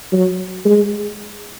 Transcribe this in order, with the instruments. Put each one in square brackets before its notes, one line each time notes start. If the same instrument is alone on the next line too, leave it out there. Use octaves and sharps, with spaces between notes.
[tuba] F#3
G#3